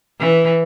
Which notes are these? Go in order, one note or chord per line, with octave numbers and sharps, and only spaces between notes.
E3